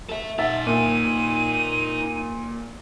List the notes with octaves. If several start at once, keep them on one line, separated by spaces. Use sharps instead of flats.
A4 E5
D#4 E5 F#5 A6
A#2 D#7